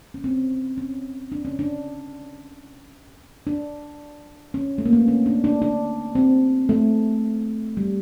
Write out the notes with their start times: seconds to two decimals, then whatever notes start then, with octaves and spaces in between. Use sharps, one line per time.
0.14 C#4
0.24 C4
0.78 C#4
1.32 D4
1.45 C#4
1.59 D4
3.47 D4
4.54 C#4
4.78 A3
4.86 A#3
4.93 B3
5.00 C4
5.08 C#4
5.26 D4
5.44 D4
5.62 D4
6.15 C4
6.69 A3
7.77 G3